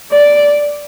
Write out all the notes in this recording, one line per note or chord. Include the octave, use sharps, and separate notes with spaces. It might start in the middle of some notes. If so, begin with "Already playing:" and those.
D5